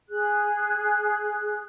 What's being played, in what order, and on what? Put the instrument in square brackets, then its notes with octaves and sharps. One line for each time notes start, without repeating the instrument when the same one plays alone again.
[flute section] G#4 F#6